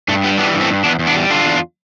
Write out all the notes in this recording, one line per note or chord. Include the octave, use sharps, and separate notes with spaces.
G2 A3
G3 B3
E3 B3 D4
G2
A3 C4
G2
E2 B3 D4
E2
B3 D4
G3
D3 D4 F4
E2